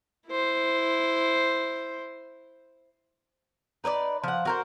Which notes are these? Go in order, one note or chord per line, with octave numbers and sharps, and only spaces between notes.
E4 C5
D#4 B4 C#5 D5
F3 F#5
F#4 A#4 C5